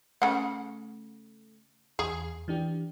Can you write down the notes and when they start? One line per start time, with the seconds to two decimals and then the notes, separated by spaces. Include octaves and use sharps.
0.22 C#3 A3 F#5
1.99 E2 G#4
2.48 E3 D4 G4